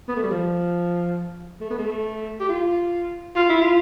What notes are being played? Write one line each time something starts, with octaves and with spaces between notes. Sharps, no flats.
B3
A3
G3
F3
A3
B3
A3
G4
F4
F4
E4
F4